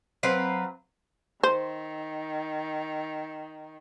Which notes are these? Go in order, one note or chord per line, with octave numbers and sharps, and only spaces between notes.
F#3 C4 B4 F5
D#3 C5